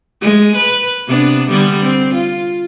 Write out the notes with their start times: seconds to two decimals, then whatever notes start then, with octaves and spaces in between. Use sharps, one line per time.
0.21 G#3
0.56 B4
1.07 C3 B3 D4
1.50 D3 G3 B3
1.82 C4
2.13 F4